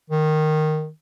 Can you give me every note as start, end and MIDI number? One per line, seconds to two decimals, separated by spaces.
0.10 0.89 51